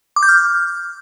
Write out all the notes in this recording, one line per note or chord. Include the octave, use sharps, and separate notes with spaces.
D6
G6
F6